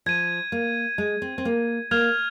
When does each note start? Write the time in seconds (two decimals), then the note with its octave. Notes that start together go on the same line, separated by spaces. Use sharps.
0.06 F3 G#6 D#7
0.52 A#3
0.98 G#3
1.22 C4
1.38 C4
1.45 A#3
1.91 A#3 F6 G#6 F7